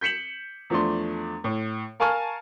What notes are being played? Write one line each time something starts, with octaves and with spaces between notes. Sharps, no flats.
G6 B6 C#7 E7 F#7
E2 F3 A3 D4 C6
A2
A#4 F5 G#5 A5 C#6 F6